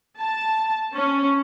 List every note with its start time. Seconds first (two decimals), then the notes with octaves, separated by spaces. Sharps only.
0.17 A5
0.93 C#4